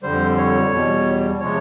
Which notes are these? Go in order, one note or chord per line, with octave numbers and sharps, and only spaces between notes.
F2 D3 G3 C5
C#5
E2 B2 G3
C3 F3 G#3 C#5